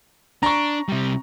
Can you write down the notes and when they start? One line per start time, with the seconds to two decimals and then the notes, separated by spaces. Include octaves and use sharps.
0.43 D4 A#5 C#6
0.89 C3 G3